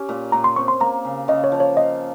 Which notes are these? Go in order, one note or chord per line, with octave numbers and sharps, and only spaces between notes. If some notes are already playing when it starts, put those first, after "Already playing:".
Already playing: C#4 G4 A#4
A#2
A#2 A#5
C6
C4 C#6
C6
A#3 A#5
C#3
C#3 D#5
C#5
F3
C#5
C5 D#5